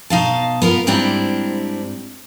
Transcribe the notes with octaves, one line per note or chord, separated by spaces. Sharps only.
B2 D#4 F5 A5
B3 F4 A#4
G#2 G3 C4 D4 E4 A#5